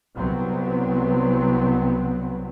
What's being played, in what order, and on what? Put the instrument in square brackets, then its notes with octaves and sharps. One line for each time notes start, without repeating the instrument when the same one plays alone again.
[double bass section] C2 F#3 B3 C4